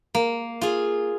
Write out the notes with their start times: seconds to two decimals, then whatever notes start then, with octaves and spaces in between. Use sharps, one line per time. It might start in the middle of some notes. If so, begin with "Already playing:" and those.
0.15 A#3
0.61 F4 G#4